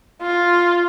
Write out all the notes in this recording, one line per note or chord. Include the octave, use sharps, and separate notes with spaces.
F4